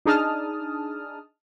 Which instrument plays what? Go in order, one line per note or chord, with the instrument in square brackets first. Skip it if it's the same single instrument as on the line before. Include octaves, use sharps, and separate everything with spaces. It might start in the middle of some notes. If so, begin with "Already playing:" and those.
[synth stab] D4 D#4 G#4 A5 D#6 F6